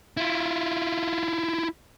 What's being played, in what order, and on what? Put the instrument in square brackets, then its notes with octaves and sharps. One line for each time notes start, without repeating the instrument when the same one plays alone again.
[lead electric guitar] E4 F4